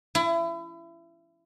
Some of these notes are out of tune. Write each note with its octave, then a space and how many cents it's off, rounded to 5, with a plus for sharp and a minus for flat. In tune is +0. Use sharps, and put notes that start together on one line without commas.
E4 +30